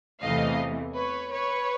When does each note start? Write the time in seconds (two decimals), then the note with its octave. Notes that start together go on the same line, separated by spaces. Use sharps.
0.22 E2 C3 E3 A3 D#5 F5
0.95 B4 C#5
1.31 B4 C#5